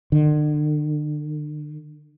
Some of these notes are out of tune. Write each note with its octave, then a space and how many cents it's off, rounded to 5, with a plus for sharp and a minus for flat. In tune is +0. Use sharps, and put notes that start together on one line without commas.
D3 +40